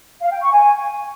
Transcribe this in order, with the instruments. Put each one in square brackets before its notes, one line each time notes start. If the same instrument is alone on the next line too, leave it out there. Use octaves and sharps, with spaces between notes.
[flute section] F5
G5
C#6
G#5